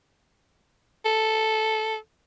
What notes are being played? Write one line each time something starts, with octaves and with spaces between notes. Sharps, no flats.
A4